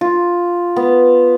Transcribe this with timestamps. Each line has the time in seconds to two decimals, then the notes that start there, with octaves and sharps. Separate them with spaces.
0.01 F4
0.76 B3